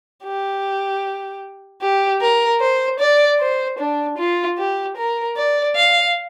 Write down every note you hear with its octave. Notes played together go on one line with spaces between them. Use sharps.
G4
G4
A#4
C5
D5
C5
D4
F4
G4
A#4
D5
F5